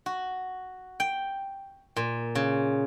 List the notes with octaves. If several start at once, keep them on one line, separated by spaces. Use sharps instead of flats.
F#4
G5
A#2
C#3